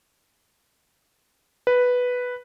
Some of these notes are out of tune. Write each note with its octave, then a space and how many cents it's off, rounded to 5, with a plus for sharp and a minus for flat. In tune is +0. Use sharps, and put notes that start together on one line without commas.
B4 +0